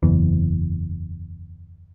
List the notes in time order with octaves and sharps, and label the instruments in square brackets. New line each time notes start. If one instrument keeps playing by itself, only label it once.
[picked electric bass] F#1 E2 E3